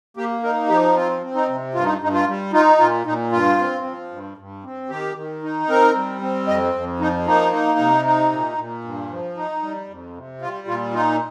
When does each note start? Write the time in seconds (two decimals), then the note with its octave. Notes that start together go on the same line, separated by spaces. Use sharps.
0.17 A#3 G4
0.43 D#4 A#4
0.69 F3 G4
0.96 C4 F4
1.22 C4
1.35 D#4
1.48 C3
1.75 G2 F4
1.84 D#4
2.01 G2 D#4
2.13 F4
2.28 G3
2.53 D#4 F4
2.79 A#2 F4
3.06 A#2 D#4
3.32 G2 F4
3.59 C4
3.85 F3
4.11 G2
4.37 G2
4.64 C4
4.90 D#3 G4
5.16 D#3
5.43 D#4
5.69 C4 A#4
5.95 G3
6.21 C4
6.48 F2 D#5
6.74 F2
7.00 F3 D#4
7.26 A#3 D#4
7.52 D#4
7.79 C3
8.05 D#4
8.32 A#2
8.58 A#2
8.84 G2
9.11 F3
9.37 D#4
9.63 G3
9.89 F2
10.16 C3
10.41 G3 F4
10.67 A#2 F4
10.94 D#4 F4